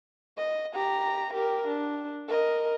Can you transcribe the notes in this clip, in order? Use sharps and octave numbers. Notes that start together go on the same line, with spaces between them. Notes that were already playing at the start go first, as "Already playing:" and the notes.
D#5
G4 A#5
G4 A#4
D4
A#4 D#5